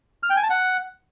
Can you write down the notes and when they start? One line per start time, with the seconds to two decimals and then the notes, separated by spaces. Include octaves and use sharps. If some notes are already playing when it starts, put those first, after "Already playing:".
0.23 F6
0.30 G5
0.37 G#5
0.43 A5
0.50 F#5